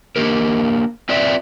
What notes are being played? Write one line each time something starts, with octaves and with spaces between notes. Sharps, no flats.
A#3 D4 G4 A#4
C4 F4 B4 D5 E5 G5